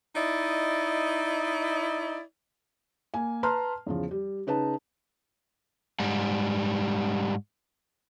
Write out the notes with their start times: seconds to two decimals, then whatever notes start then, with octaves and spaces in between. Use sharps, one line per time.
0.16 D#4 E4 D5 D#5
3.14 A#3 G#5
3.43 B4 A5 A#5 C6 F6
3.86 E2 C#3 F3
4.11 G3
4.47 C#3 D#4 B4 A5
6.00 G#2 G3